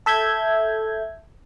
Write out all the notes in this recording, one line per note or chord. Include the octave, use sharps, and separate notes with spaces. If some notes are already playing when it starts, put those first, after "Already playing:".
A4 E5 G6 G#6